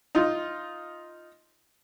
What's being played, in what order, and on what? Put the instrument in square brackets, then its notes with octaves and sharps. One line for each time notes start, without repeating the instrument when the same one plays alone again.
[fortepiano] D#4 F4